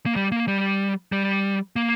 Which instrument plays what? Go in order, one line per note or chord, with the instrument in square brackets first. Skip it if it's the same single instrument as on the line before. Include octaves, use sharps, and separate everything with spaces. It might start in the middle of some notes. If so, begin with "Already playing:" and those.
[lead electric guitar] A#3
G3
A#3
G3
G3
A#3